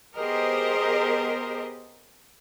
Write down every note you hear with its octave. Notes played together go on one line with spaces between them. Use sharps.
B3 G4 G#4 A#4 C5 D#5